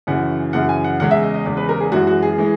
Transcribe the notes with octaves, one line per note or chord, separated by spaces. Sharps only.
F#2 C#3 E3 F#5
F#2 C#3 E3 F#5
G#5
F#5
E2 C#3 G#3 F#5
E5
D#5
D#5
E2 C#3 G#3
B4
A#4
G#4
F#2 E3 G#3 F#4
F#4
G#4
E3 G#3